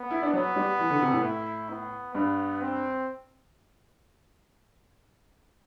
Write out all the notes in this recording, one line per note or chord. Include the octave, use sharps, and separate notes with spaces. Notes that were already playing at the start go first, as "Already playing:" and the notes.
Already playing: B3
E4
D4
F#3 B3
G3
E3
D3
C3
A2
E4
B3
G2 B3
C4